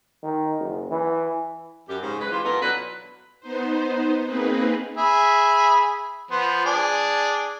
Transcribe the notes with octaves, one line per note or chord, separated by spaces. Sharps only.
D#3
F#1
E3
F#2 G4
G#2 C#3
G#3 B4
E3 F4 G4
F#2 B2 B3 F4 A4 A#4
B2 E3 F#3 D4 B4
B3 D#4 C5
A#3 C4 D#4 G#4 B4
G#4 E5 B5
F3 B3 C5
D4 G#4